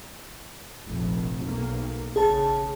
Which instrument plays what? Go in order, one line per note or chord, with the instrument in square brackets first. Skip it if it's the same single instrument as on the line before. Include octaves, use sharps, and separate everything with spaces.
[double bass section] F1 A#1
B1 A#3
[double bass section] A1 C#3 [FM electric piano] G#4 A5